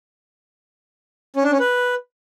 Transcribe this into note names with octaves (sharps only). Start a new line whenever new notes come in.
C#4
D4
C#4
B4